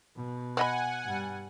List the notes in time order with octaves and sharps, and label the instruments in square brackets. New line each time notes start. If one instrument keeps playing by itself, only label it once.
[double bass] B2
[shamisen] C4 D#5 B5 [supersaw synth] F#5 G#5
[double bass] G2 G3